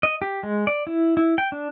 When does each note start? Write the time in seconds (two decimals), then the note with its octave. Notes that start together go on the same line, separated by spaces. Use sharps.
0.03 D#5
0.22 G4
0.43 G#3
0.67 D5
0.87 E4
1.17 E4
1.38 G5
1.52 D4